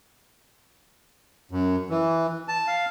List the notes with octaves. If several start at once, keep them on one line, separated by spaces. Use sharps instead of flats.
F#2
E3
A5
F5